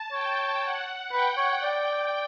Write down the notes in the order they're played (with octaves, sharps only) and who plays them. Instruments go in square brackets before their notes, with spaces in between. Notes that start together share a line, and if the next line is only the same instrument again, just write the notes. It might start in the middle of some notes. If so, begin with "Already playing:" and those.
Already playing: [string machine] A5
[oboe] C#5 [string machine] G5
[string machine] F#5
[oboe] B4 [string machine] G5
[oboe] C#5
[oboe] D5 [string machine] G5